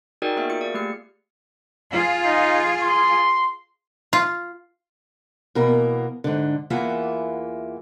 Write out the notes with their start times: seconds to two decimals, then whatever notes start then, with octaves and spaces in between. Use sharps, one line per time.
0.22 D#4 F#4 G#4 A#4 D5 G5
0.36 A#3 B3 F#4 G#4 A#4 E5
0.49 F4 G#4 C#7
0.61 D5
0.74 A3 A#3 G4 F6 C#7
1.92 F4 G#4
2.24 D#4
2.81 C6
4.13 F4
5.55 B2 E3 A#3 A#4
6.24 G#2 D3
6.70 E2 E3 A#3 F4 E5 F#5